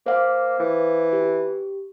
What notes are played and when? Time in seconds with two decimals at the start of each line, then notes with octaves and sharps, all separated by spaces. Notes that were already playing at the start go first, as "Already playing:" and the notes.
0.06 A#3 C5 F5 D6
0.60 E3
1.13 G4